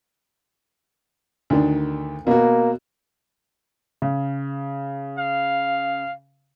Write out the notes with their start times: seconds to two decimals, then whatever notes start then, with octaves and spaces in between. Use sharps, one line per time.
1.50 D2 D#3 D4
2.27 B2 A#3 F#4
4.02 C#3
5.19 F5